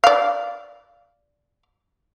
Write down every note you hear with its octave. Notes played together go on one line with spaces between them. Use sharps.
D5 F5